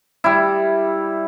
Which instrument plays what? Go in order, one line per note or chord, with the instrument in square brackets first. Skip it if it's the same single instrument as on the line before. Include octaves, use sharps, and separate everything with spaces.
[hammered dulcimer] G3 E4